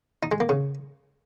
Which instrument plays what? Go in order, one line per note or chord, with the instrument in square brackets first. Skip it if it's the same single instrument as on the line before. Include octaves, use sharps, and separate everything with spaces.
[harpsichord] D#4
G#3
A#3
C#3